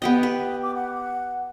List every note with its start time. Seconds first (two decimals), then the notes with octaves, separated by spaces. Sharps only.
0.02 B3 G4 D#5 G5
0.23 B4
0.63 D6
0.75 F#5